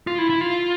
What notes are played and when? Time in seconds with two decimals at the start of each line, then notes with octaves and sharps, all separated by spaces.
0.07 F4
0.18 E4
0.30 E4
0.41 F4